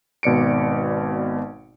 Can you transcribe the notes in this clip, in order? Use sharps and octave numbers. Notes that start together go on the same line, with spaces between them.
G#1 B2 D5 C#7 D7